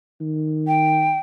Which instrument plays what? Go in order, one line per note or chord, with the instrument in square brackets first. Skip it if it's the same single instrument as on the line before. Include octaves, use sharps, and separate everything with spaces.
[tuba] D#3
[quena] G5